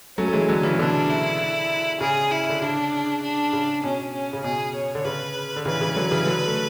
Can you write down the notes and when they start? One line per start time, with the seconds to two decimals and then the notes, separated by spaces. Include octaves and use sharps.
0.18 F#3 A3 C#4
0.28 A3
0.33 E3 G#3
0.48 D3 F#3
0.63 C#3 E3
0.79 B2 D3 D4
1.09 E4
2.01 C#3 G#4
2.31 E4
2.49 D3
2.62 C#3 D4
3.22 D4
3.53 C#3
3.83 B2 C#4
4.13 C#4
4.33 C#3
4.44 B2 G#4
4.75 C#5
4.95 D3
5.05 C#3 B4
5.56 D3
5.65 C#3 E3 B4
5.81 C#3 E3
5.96 D3 F#3
6.11 C#3 E3
6.26 D3 F#3
6.48 A3